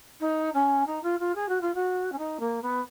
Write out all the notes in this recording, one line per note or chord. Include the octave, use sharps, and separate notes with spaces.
D#4
C#4
D#4
F4
F4
G#4
F#4
F4
F#4
C#4
D#4
A#3
B3